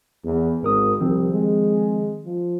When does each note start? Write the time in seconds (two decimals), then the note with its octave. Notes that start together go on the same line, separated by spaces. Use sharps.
0.25 E2
0.63 G#1 G#2 A#4 D#6
1.01 C2 D#3 F3 C4
1.33 G#3
2.25 F3